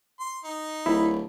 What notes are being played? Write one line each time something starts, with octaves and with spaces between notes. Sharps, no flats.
C6
D#4
D1 E4 B5